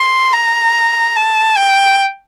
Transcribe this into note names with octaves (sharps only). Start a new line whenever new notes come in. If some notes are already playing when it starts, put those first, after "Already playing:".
Already playing: C6
A#5
A5
G5